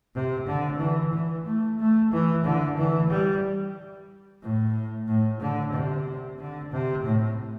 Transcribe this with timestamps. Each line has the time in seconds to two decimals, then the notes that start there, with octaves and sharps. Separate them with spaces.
0.15 C3
0.47 D3
0.80 E3
1.13 E3
1.46 A3
1.79 A3
2.12 E3
2.44 D3
2.78 E3
3.11 G3
4.42 A2
5.07 A2
5.40 D3
5.73 C3
6.39 D3
6.72 C3
7.05 A2